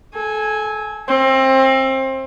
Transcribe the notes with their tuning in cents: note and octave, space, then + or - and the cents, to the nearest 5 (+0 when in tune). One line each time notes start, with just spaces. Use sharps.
A4 -30 G#5 +0
C4 +25 E5 +0